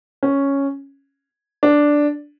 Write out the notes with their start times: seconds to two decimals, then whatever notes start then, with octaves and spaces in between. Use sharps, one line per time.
0.23 C#4
1.63 D4